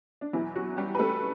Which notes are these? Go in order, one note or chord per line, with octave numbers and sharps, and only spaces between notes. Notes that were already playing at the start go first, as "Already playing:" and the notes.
D4
E2 B2 E3 F#3 E4
F#3 F#4
G3 G4
B4
A3 A4